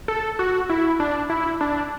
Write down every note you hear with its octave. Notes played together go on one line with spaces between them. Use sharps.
A4
F#4
E4
D4
E4
D4